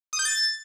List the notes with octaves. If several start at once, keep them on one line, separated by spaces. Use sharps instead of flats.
D#6
G6
A6